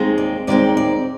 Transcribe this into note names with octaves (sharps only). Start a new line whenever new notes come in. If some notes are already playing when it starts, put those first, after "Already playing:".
Already playing: D#2 D#3 G#3 C4
D5
D#2 D#3 G#3 C4 D5
D5